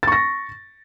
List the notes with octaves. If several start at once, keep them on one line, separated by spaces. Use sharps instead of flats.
C#6 A6 A#6